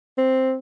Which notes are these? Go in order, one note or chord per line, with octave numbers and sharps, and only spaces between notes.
C4